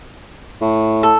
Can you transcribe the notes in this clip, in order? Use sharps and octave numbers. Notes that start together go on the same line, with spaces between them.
A2
A4